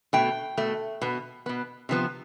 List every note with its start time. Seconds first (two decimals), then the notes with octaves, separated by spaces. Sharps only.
0.13 B2 A3 G5
0.57 B2 A3
1.02 B2 B3
1.46 B2 B3
1.89 C3 F3 B3